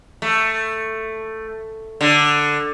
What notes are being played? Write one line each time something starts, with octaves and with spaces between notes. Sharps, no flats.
A3
D3